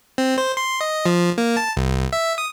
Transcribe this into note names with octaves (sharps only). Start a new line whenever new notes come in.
C4
C5
C6
D#5
F3
A#3
A5
C2
E5
D#6